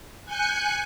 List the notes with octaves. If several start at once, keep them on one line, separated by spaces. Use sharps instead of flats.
G#5 F#6 G6 C#7